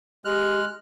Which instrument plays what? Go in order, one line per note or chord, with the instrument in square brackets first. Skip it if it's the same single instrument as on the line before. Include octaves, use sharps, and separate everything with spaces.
[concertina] G#3 F6 F#6 [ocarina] G4